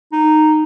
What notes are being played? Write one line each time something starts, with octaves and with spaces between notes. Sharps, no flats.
D#4